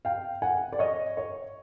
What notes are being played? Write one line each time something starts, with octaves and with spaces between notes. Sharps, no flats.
F5 G5
F#5 G#5
D5
C#5 D#5
C#5